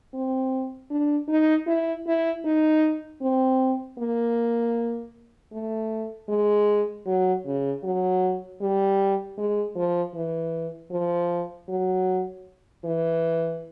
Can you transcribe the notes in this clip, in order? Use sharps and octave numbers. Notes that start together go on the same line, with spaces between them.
C4
D4
D#4
E4
E4
D#4
C4
A#3
A3
G#3
F#3
C#3
F#3
G3
G#3
F3
E3
F3
F#3
E3